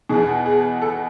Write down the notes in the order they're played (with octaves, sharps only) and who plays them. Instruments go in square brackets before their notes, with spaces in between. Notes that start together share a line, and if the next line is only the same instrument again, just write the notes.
[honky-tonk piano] E2 B2 G#4
G#4
A4